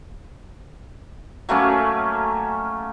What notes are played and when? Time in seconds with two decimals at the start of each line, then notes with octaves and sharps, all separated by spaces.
1.49 F#3 A3 A#3 C#4